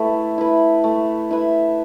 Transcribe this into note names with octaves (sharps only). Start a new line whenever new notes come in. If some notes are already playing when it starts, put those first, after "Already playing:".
Already playing: A3 E4 B4
E4 B4
A3
E4 B4